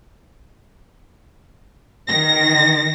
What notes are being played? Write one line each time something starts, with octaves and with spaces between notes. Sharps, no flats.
D#3 A#6